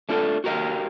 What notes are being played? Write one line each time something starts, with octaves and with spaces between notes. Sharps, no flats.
A3 D4 F4 A4
F#4 G4 A#4 C#5 D#5 F5